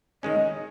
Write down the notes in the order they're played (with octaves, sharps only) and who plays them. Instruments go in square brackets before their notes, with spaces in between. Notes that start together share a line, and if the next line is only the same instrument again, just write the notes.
[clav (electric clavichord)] D#3 G#3 C#4 [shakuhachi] D#5